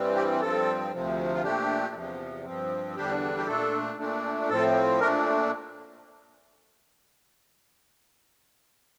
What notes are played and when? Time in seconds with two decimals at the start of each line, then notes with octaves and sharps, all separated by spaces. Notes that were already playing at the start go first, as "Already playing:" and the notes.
Already playing: G2 E3 G3 C4
0.15 G4
0.41 G2 F3 C4 A4
0.93 D2 C3 F3
1.34 F4
1.43 A#2 A3 D4 G4
1.95 E2 C3 F3
2.45 G2 F3 C4
2.96 E2 D3 G3 D4 G4
3.37 G4
3.47 A#2 A3 D4 A4
3.98 A#2 A3 D4
4.49 A2 F3 C4 A4
5.00 A#2 A3 D4 A#4